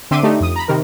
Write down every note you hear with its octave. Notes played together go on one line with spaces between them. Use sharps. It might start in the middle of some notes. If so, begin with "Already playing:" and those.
D3 C4 E5 C6 D6 D#7
A3 D4 D#4 G4
F2 D#6
A#5 B5
C3 D#3 A#4